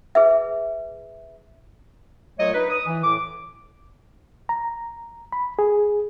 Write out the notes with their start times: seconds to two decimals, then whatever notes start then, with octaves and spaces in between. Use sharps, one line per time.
0.15 G#4 B4 E5
2.39 A#2 F#3 A3 C#5 D#5
2.54 D#4 B4
2.70 D#6
2.86 E3
3.03 A2 D6
4.49 A#5
5.32 B5
5.59 G#4